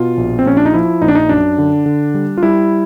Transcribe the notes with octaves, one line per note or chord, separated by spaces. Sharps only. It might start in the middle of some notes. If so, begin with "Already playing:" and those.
Already playing: B2 F4
A#1
C4
A#1 C#4
D4
D#4
F3 E4
A#1 D#4
D4
D#4
F#2 D4
D3
D3
G3
F4
G3 E4